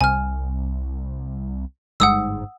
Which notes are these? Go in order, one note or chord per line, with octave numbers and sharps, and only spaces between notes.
C2 G#5 F6
G1 G#2 F#5 D#6 E6